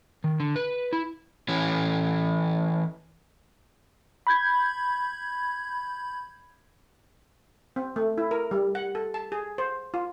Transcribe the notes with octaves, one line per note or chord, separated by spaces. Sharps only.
D#3
D3
B4
E4
E3 C#4
B5 G6 G#6
C4
A3
E4
A#4
G3
F#5
A4
A5
G#4
C5
F4